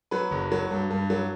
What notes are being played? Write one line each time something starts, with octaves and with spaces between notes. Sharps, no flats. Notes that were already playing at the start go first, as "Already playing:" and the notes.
F#3 B4
F#1
F#3
G2
G2
F#3